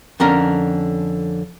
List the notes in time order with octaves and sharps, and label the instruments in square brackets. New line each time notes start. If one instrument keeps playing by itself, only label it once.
[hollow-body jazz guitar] F2 D3 C#4 A#4